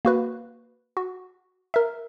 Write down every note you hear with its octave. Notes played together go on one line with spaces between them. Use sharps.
A#3 F#4 B4
F#4
A#4 E5